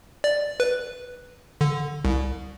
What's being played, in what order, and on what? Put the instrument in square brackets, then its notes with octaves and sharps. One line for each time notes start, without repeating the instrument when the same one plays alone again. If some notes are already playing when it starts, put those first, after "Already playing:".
[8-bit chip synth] D5
B4
D3
C2